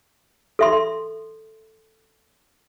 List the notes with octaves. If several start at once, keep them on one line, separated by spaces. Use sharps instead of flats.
A4 E5 C6